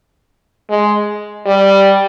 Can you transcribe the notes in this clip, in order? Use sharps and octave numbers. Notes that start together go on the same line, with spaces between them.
G#3
G3